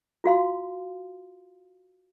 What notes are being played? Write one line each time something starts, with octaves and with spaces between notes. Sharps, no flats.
F4 F#4 F5 C6